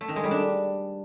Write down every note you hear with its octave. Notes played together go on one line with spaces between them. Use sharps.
A3
D#3
G#3
G3
D4